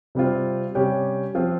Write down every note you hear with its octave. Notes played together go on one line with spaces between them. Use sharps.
C3 G3 C4 F4
C3 G3 C#4 G4
F3 C4 F4